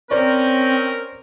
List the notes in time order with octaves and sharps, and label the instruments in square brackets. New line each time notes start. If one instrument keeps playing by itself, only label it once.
[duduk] C4 [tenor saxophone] C#4 [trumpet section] A#4 [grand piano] C5 D5